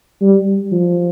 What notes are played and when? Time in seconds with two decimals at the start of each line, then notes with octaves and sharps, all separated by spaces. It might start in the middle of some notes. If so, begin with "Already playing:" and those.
0.21 G3
0.71 F3